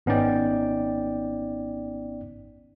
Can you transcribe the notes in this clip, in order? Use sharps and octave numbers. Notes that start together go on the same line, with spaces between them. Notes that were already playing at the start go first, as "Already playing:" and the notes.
G#1 B3 C#4 D#4 D5 G5